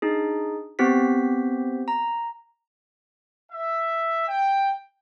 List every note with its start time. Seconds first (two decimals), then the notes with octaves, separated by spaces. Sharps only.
0.02 D4 D#4 G#4
0.79 B3 C4 G4 C5 B6
1.88 A#5
3.51 E5
4.27 G5